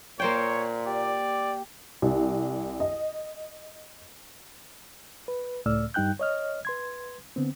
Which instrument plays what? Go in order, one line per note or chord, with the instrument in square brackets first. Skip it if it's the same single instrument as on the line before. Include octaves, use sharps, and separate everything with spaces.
[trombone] A#2 [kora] A#3 C5 G5 [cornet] C#5
[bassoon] G4 [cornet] D5
[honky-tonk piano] C2
D#5
[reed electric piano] B4
C#2 A2 A3 D5 E6 F6
G2 G3 D#4 G5 F#6 G6
C#5 D#5 F6
B4 C6 G#6
D3 B3 C4